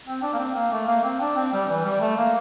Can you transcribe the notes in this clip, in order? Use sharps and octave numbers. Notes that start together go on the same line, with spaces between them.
C4
D4
A#3
C4
A#3
A3
A#3
C4
D4
C4
G3
E3
G3
A3
A#3